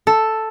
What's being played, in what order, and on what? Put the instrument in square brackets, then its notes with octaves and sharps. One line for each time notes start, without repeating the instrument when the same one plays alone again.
[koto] A4